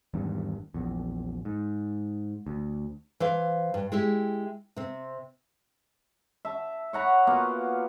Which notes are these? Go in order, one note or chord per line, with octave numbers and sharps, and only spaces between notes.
G#1 E2 G2
A#1 E2
G#2
D2
E3 C5 F5
G2
G#3 E4 G4
C3 C4
E5 A5
C#5 F#5 A#5 B5
A#3 B3 F4 F#4